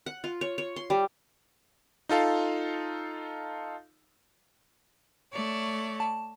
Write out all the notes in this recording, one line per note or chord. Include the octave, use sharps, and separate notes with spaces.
F#5
F4
C#5
C#5
C6
G3
D#4 F4 A4 F5
A3 C#5 D5
A5